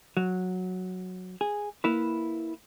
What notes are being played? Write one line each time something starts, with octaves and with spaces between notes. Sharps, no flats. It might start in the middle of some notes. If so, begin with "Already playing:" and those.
F#3
G#4
A#3 E4 B4